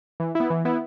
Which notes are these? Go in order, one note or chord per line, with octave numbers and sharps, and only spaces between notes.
E3
B3 E4
E3
B3 E4